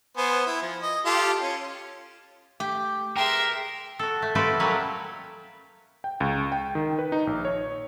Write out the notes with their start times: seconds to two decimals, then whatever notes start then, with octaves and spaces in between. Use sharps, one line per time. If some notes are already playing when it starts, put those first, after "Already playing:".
0.17 B3 C5 G#5
0.46 E4
0.62 F3
0.82 D#5
1.06 F4 G4 A4
1.42 C#4
2.60 A3 G4
3.17 G#4 A#4 B4 E5 G5 C6
3.99 F#4 A4
4.22 A3
4.35 A3 F4 F#4 A4 B4 D5
4.60 F#3 G3 A#3 C#4 B4 C#5
6.04 G5
6.20 C#2
6.52 G5
6.75 D#3
6.99 B4
7.12 D#4
7.27 A#1
7.45 C#5